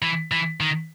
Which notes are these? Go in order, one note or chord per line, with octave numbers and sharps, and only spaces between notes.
E3
E3
D#3